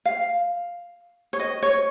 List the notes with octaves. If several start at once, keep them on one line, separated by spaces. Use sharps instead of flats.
F5
C#5
D#5
C#5